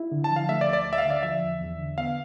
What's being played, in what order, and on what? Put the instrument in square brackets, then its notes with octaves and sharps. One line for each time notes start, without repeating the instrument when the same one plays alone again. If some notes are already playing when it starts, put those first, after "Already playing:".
Already playing: [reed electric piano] E4
D3
[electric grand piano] A5
[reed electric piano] F3
[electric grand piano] F5
[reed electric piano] A3 [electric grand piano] E5
[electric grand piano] D5
[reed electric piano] D2
[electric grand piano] D5
[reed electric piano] D2
[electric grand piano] E5
F5
[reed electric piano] D3
[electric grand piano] D5
[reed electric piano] F3 [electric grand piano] E5
[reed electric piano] E2
E2
D3
[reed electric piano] B3 [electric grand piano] F5